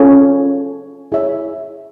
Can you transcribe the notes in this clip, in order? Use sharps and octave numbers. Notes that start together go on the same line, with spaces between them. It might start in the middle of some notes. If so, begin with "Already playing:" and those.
Already playing: C#4 F4 A4 C#5
E4 G#4 C#5 E5